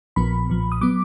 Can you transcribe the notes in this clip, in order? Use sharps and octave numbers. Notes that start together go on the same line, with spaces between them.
A#1 A#2 F3 B3 B5
B1 A#2 F3
D#6
F#3 B3 D6